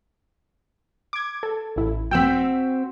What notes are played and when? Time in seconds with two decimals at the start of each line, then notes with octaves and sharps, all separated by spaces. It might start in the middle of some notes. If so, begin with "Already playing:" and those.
1.13 D6 G#6
1.43 A4
1.76 A1 E4
2.11 C4 F#4 G5 E6 B6